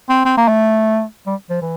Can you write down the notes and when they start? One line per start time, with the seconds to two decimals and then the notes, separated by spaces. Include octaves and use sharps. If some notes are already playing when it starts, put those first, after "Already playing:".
0.09 C4
0.25 C4
0.38 A#3
0.48 A3
1.27 G3
1.50 F3
1.62 E3